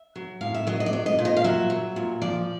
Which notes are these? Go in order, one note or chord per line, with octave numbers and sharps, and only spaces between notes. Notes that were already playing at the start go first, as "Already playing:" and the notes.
Already playing: E5
F#3
A2 F5
E5
F#3 D#5
D#5
D5
F#3
D#5
A#2
D#5
F5
F#3 E5
F#3
A#2
F3 D5